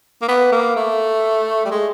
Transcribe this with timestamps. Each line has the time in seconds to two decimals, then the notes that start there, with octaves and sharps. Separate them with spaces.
0.22 A#3
0.29 B3
0.52 A#3
0.76 A3
1.65 G3
1.71 G#3